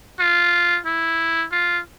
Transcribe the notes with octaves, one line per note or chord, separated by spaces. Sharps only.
F4
E4
F4